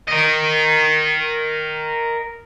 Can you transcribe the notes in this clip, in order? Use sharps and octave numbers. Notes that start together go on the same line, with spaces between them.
A#4 D#5